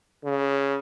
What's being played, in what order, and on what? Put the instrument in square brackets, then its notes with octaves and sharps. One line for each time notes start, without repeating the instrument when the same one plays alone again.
[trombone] C#3